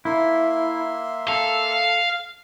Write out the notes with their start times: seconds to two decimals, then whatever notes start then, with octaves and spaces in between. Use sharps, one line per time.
0.05 A#3 E4 E5 C6
1.28 A4 F5